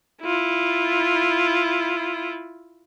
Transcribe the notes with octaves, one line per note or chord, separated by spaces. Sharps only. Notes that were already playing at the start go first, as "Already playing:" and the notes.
E4 F4